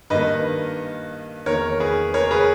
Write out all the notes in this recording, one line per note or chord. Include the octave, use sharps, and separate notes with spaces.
G2 D#3 A#3 B4 D#5
E2 D#3 A#3 A#4 C#5
G#4 B4
A#4 C#5
G#4 B4